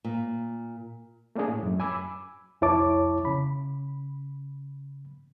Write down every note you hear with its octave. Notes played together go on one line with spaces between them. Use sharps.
A#2
A3 A#3 C#4 D4 G#4
A2
F#2
G#5 B5 D6 E6
C2 F2 E4 C#5 A5 D6
C#3 B5